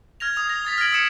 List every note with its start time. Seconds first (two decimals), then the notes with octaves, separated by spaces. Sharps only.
0.20 F6 G#6 A#6 F7
0.36 D#6 F7
0.49 A#6
0.65 D#6 A6 B6
0.78 F6 G#6 A#6 D7 F#7
0.92 D#6 E6 G#6 C7 C#7 E7